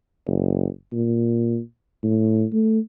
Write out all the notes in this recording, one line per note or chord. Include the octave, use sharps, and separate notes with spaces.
F#1
A#2
A2
A3